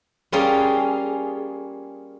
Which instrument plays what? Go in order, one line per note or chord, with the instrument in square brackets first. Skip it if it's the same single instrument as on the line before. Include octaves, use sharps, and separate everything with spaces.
[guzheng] G3 A#3 C#4 F4 G#4